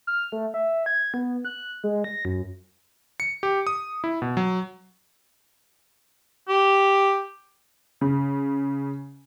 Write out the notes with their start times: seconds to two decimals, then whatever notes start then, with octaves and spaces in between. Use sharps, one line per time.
0.07 F6
0.32 A3
0.54 E5
0.86 G#6
1.14 B3
1.45 F#6
1.84 G#3
2.04 A#6
2.25 F#2
3.20 C#7
3.43 G4
3.67 D#6
4.04 E4
4.22 B2
4.37 F#3
6.48 G4
8.01 C#3